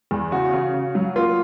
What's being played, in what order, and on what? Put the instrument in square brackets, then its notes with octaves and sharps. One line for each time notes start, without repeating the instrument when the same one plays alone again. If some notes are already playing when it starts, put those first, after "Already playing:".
[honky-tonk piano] E2
[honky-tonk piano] C#3 [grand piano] F#4
[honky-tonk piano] C#3
C#3
F#3
[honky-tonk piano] A#3 [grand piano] F4